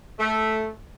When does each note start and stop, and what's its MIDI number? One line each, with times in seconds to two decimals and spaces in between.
0.20 0.68 57